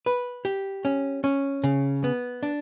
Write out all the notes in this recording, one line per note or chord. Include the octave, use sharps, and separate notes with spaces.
B4
G4
C#4
C#4
C#3
B3
D4